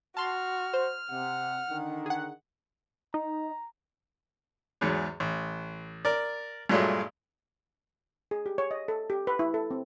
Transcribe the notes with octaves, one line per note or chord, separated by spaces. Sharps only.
F#4 A5 C6 F6
C5
C3 F#5
D3 D#3
G#4 F#5
D#4 A#5
E2 G#2 F#3
A1
A#4 D5
G2 A#2 F#3 G#3 A3
G#4
G4
C#5
D#5
A4
G4
B4
E4
A4
C4